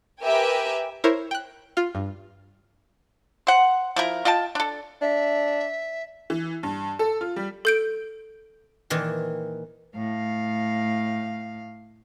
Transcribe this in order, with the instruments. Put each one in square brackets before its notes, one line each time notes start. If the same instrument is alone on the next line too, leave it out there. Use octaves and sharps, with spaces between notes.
[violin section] G4 A#4 B4 E5 G5 G#5
[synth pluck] E4 A#4 C5 C#5
G5 F#6
F4 F5
G2
[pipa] C5 F#5
F3 E4 A#4
F4 D#5 G5 A5
D4 A4
[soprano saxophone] D4 [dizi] E5
[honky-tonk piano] E3
G2
A4
F4
G3
[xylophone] A4 G6 D7
[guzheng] A#2 D#3 E3
[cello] A2 F5